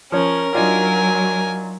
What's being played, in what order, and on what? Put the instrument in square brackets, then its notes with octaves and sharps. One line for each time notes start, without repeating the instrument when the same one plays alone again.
[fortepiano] F3 C#5 [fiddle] C#4 [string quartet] A#4
[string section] F#3 [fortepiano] D4 D#4 F4 [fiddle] G#5